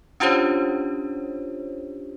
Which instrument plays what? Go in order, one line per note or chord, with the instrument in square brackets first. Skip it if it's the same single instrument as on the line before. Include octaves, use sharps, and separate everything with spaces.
[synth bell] C#4 D4 F4 G4 C5 C#5